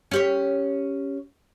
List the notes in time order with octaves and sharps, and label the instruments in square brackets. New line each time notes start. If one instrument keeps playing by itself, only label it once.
[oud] C#4 G4 C#5